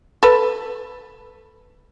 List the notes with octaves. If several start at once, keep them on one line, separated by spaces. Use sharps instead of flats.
A4 B4